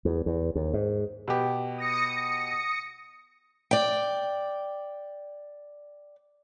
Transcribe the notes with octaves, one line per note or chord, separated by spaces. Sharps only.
E2
E2
D#2
G#2
B2 G4
D#6 A#6 C#7
D5 G5